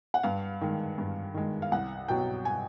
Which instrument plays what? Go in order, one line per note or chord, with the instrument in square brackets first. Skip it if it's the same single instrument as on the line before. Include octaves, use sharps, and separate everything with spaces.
[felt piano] F#5
G2 F5
D#3 G#3
G2
D#3 G#3
F5
C2 F#5
B2 F#3 G5
G#5